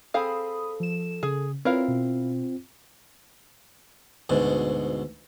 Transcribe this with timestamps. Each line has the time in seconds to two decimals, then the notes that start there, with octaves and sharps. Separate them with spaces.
0.14 C4 G#4 A4 F5 B5 D#6
0.80 F3 E7
1.23 C#3 G#4
1.65 C4 E4 F4 A#4 B4 C#5 F5
1.88 B2
4.29 D2 G#2 B2